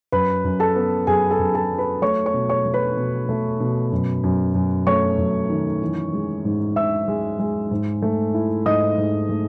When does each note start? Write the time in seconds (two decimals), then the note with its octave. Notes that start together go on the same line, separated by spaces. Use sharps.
0.12 F#2 B4 B5
0.44 F#2
0.60 A4 A5
0.76 B3
1.07 F#2 G#4 G#5
1.31 A4 A5
1.39 F#2
1.55 A4 A5
1.70 F#3
1.78 B4 B5
2.02 A3 C#5 C#6
2.26 C#5 C#6
2.34 B2
2.50 C#5 C#6
2.66 A3
2.74 B4 B5
2.97 B2
3.29 A3
3.60 B2
3.92 F#2
4.23 F#2
4.55 F#2
4.87 A3 C#5 C#6
5.18 F#2
5.50 D#3
5.81 E3
6.13 G#3
6.45 G#2
6.76 G#2 E5 E6
7.08 G#3
7.39 G#3
7.71 G#2
8.02 A3
8.34 E4
8.66 G#2 D#5 D#6
8.97 G#2
9.29 A3